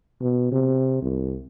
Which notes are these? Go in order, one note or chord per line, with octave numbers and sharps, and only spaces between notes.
B2
C3
C2